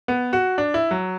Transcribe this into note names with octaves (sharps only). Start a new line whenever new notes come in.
B3
F#4
D4
E4
F#3